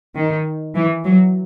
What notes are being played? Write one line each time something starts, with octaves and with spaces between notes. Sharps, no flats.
D#3
E3
F#3